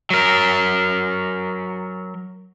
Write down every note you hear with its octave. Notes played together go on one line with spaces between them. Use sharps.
F#3 A#4